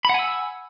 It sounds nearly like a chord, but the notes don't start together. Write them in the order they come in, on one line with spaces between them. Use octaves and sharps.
B5 F#5 G#5 E6